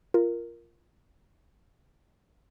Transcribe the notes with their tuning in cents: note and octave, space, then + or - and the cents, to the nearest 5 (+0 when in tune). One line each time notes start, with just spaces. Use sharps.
F4 -15 A#4 +0